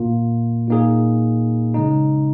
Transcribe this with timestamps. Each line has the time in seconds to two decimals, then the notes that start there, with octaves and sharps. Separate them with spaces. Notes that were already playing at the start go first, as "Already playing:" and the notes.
Already playing: A#2 A#3 F4
0.68 A#2 A#3 D#4 G#4
1.74 C#3 G#3 D#4